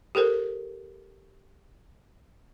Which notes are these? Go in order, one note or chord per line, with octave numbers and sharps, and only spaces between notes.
G4 A4 A#4 C5